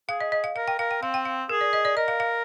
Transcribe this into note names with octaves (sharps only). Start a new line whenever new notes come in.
G#4 F5
D#5
D#5
F5
A#4 F5
G5
A#4 F5
G5
C4 F5
G5
F5
G#4 A#4
D5
D#5
D5
A#4 D#5
F5
F5